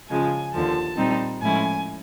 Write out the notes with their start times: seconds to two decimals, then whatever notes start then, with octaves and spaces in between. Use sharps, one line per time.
0.09 C#3 F3 G#3 G#5
0.53 D#2 D3 F3 A5
0.97 A#2 G3 C4 D#4
1.42 A2 F3 G#3 C#4 E4 G#5